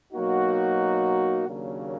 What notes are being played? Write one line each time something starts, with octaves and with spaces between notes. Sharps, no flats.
B2 F#3 A#3 D#4 F#4
D#2 C#3 F#3 A#3 D4